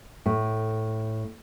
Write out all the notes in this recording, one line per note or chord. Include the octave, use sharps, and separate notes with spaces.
A2 A3